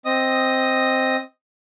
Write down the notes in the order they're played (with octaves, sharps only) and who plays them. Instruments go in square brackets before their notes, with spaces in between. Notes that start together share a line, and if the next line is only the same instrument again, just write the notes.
[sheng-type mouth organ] C4 D#5 D#6